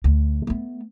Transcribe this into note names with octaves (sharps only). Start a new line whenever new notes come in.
D2
A3 B3